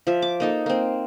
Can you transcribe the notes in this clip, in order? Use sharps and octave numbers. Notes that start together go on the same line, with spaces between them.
F3 E5
D6
A#3 D#4 A4
A#3 C4